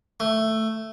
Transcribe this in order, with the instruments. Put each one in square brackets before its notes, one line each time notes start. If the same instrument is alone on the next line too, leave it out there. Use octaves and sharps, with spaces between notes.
[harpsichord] A3